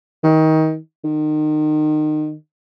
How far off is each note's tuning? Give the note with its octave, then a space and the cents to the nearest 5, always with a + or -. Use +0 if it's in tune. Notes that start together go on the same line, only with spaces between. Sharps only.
D#3 +25
D#3 -30